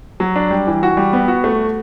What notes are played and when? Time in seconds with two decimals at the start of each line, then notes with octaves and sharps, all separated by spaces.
0.20 F#3
0.36 D4
0.51 G3
0.67 E3
0.83 F#4
0.97 G3
1.13 B3
1.28 F#4
1.44 A3